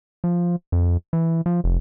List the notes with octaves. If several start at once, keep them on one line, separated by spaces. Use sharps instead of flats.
F3
F2
E3
F3
F1